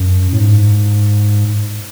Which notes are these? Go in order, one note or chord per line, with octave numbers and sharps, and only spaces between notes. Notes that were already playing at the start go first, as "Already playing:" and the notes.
Already playing: F#2
A2
G#2